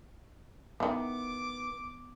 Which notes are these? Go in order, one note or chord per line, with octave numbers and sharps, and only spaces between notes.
D#3 E3 B3 D6